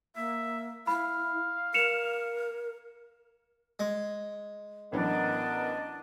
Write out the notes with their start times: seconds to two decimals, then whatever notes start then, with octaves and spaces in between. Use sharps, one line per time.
0.16 A#3 E5
0.87 E4 F5 B5
1.74 A#4 C#7 E7 F7
3.80 G#3
4.92 A1 E3 F#3 B3 D4 A#4 D#5